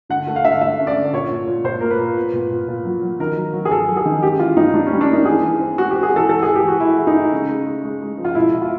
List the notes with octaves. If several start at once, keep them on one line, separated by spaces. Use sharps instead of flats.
D3 F#5
A3
F5
D3 E5
F5
A3 E5
C#4
D5
D3
A#2 C#5
A#2
A#2
A#2 C5
A#3 A#4
B4
A#2
B3
A#2
A#2
A#2
F#3
F#3
D#3 A#4
F#3
F#3
G#4
F#3 A4
F#3
G#4
D#3
C#4 G4
E3 F4
G3 D#4
G3 D4
C#4
G3
D4
A#3 D#4
E3 G#4
E3
C4
G#3 F#4
C4 G4
G#4
E3 A4
E3 A4
E3 G#4
G4
E3 F#4
E3 E4
G#3
D#4
G#3
C#3
G#3
G#3
G#3
G#3
F3
F4
B2 E4
B2
F4